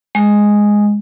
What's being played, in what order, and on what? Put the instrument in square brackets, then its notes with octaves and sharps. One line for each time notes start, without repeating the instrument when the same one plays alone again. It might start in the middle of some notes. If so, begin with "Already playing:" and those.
[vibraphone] G#3